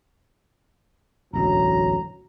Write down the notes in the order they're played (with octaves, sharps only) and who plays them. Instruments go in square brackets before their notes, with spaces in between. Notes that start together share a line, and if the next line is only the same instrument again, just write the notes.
[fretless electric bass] E1 A1 D2 [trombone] F#3 [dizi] A#5